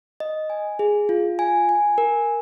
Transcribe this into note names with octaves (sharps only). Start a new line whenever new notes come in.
D#5
G#5
G#4
F4
G#5
G#5
A#4